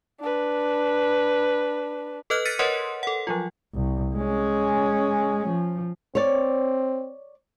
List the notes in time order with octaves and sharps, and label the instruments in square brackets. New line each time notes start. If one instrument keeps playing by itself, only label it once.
[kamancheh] D4 B4
[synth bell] A4 B4 D#5 F6 F#6
F6 A6 B6 C#7 D#7
A#4 B4 C#5 D#5 F#5 C6
A4 F#5
F3 F#3 F4
[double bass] C2
G#3 C#4
F3
[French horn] C4 [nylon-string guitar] C#5 D5